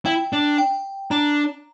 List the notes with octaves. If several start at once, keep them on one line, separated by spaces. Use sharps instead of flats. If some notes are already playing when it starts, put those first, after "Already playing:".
E4 G5
D4
G5
D4 A#5